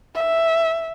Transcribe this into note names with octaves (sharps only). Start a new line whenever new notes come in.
E5